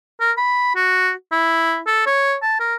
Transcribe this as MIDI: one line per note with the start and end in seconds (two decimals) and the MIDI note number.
0.20 0.32 70
0.37 0.71 83
0.76 1.12 66
1.32 1.79 64
1.87 2.03 69
2.07 2.36 73
2.42 2.57 81
2.60 2.76 70